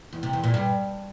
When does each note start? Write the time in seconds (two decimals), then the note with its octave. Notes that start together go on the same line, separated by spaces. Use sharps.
0.13 E2
0.23 C3
0.33 E2
0.44 A#2
0.54 G2